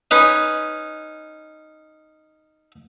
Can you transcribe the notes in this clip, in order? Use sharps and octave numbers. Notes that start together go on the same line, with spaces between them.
C#4 D#4 B4 D#5